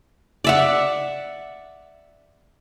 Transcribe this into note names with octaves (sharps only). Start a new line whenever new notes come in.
D5 E5 F#5